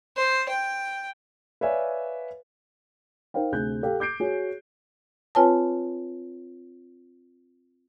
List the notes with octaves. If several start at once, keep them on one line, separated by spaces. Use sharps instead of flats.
C5
G5
B4 C#5 D5 E5 F5 G#5
D#4 A#4 C5 F5 G5
D2 C3 G#4 F#6 G6
G4 A4 F5
D6 G6 C7 D7
F#4 G#4 C#5
C4 F4 B4 C#5 G#5 A5